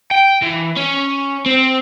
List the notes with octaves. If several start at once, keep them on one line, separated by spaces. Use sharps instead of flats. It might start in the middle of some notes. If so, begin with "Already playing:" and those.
G5
E3
C#4
C4